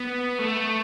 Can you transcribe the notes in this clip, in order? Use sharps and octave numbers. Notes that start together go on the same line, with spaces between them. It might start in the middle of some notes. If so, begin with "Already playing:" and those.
Already playing: B3
A3